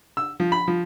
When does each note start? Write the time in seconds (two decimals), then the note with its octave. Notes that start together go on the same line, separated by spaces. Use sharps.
0.17 E6
0.40 F3
0.52 B5
0.68 F3